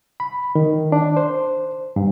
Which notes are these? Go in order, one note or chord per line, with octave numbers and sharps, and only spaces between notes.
B5
D#3
D4
C5
G2